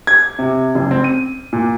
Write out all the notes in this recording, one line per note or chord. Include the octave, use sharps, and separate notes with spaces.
G#6
C3
F#1
C4
D#7
A#2